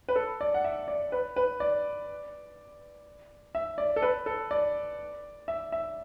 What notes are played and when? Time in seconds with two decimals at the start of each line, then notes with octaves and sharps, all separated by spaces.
0.09 B4
0.16 A4
0.41 D5
0.54 F#5
0.64 E5
0.88 D5
1.12 B4
1.36 B4
1.60 D5
3.55 E5
3.78 D5
3.96 A4
4.02 B4
4.26 A4
4.51 D5
5.48 E5
5.72 E5